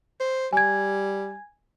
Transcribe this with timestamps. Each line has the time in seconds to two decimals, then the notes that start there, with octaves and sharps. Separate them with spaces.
0.20 C5
0.53 G3 G#5 G#6